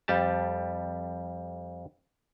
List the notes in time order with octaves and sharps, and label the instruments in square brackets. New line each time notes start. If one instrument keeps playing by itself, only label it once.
[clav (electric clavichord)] F2 G3 G4 A5